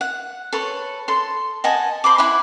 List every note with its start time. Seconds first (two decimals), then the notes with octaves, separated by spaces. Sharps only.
0.01 F#5
0.53 A4 B4 C#5
1.08 A4 C6
1.64 D#5 F#5 G#5 A5
2.04 C5 B5 D6
2.18 E4 F#5 B5